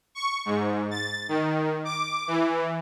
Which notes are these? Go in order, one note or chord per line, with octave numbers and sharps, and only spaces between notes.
C#6
G#2
A6
D#3
D6
E3